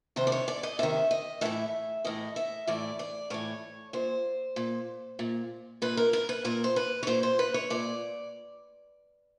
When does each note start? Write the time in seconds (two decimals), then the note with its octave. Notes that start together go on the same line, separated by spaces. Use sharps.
0.16 C3 D#3 C5
0.27 D5
0.32 C#5
0.48 D5
0.63 D#5
0.79 C3 D#3 E5
1.11 D#5
1.41 A2 E3 E5
2.05 A2 E3 D#5
2.36 E5
2.67 A2 E3 D5
2.99 D5
3.30 A2 E3 C#5
3.93 A#2 C5
4.56 A#2
5.19 A#2
5.82 A#2 B4
5.97 A#4
6.13 A#4
6.29 B4
6.45 A#2 A#4
6.64 C5
6.76 B4
7.03 C#5
7.07 A#2 C5
7.23 C5
7.39 B4
7.54 C#5
7.70 A#2 D5